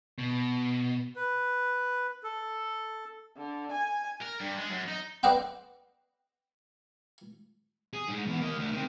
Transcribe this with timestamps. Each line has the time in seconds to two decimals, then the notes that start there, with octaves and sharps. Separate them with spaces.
0.19 B2
1.16 B4
2.23 A4
3.37 D3
3.72 G#5
4.22 A#4
4.41 G2
4.59 G#3
4.70 F#2
4.89 D#4
5.23 B4 D5 D#5 F#5 G5 C6
7.93 G#4
8.09 G#2
8.27 E2 E3
8.41 A#3 D#5
8.57 D2
8.72 D#3 C4